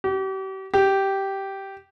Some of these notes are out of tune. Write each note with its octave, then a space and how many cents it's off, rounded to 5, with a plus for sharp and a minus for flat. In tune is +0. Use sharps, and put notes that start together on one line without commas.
G4 -40
G4 -10